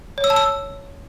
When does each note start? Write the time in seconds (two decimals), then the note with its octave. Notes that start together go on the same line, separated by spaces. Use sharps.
0.18 C#5
0.24 E6
0.30 A5
0.36 E6